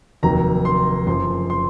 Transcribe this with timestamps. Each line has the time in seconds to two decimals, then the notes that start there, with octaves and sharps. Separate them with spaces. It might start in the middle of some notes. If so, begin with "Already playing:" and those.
0.23 F1 D#2 D#3 F#3 A#5
0.65 C6
1.07 F#1 F#2 F3 C6
1.50 C6